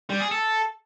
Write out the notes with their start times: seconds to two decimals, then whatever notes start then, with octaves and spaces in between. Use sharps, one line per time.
0.10 G3
0.21 G#4
0.31 A4